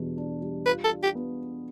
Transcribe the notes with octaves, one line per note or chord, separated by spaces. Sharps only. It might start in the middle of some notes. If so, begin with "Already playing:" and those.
Already playing: E2 B2 G3 D4
D4
G3
F4 B4
A4
D4
G4
B3